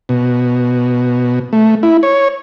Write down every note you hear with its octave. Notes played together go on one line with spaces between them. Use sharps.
B2
A3
E4
C#5